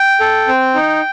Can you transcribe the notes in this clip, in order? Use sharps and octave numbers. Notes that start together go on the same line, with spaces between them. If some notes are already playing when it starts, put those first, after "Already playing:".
Already playing: G5
A4
C4
D#4